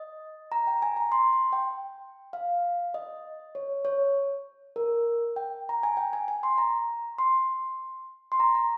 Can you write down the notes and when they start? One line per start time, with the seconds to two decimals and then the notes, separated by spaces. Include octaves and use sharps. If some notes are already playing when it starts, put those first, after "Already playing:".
Already playing: D#5
0.52 A#5
0.67 G5
0.82 G#5
0.97 A#5
1.12 C6
1.33 C6
1.53 G5
2.33 F5
2.94 D#5
3.55 C#5
3.85 C#5
4.76 A#4
5.36 G5
5.69 A#5
5.83 G#5
5.97 G5
6.13 G#5
6.28 G#5
6.43 C6
6.58 A#5
7.18 C6
8.32 C6
8.40 A#5
8.55 A#5